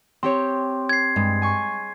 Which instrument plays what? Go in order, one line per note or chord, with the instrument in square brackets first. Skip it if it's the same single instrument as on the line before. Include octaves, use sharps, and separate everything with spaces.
[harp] C4 G4 C#5 [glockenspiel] C6
[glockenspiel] G#6 C7
[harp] G2 G#3
G#5 C#6